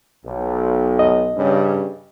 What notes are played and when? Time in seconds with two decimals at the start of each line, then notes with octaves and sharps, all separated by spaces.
0.24 B1
0.99 D#5
1.36 G2 C#3 C#4